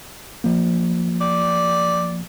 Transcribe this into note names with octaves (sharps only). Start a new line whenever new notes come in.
F3 A#3
D5